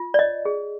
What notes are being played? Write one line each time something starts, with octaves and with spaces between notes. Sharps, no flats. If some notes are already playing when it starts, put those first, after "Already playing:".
Already playing: F4
D5
C#5 D#5
G#4